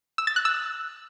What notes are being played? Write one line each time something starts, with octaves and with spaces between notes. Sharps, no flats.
E6
A6
F#6
E6